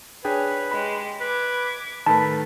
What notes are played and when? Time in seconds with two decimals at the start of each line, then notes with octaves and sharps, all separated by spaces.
0.25 D4 G#4 B4 C#5 G5 G#5
0.72 G#3 G4 B5
1.21 B4 D6 G#6
2.06 A2 D#3 A4 B4 A5 B5